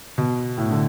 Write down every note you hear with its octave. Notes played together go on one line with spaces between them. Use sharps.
B2
A2
D3